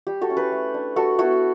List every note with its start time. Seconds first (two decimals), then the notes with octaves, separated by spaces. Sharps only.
0.07 G3 G4
0.21 F#4 A4
0.29 C#4 E4
0.37 G4 B4
0.52 A3
0.74 D4
0.96 G3 F#4 A4
1.19 B3 E4 F#4 A4